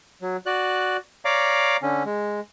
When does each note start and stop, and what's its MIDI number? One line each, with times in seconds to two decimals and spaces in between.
0.22 0.37 54
0.46 0.97 66
0.46 0.97 74
0.46 0.97 90
1.25 1.77 73
1.25 1.77 74
1.25 1.77 77
1.25 1.77 82
1.25 1.77 86
1.82 2.03 50
1.82 2.03 61
2.05 2.40 56